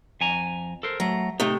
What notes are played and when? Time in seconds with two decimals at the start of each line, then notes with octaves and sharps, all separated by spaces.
0.21 F2 G#5 A#5
0.83 A4 A#4 C5
1.00 F#3 A3 A#5
1.40 C3 A3 D#4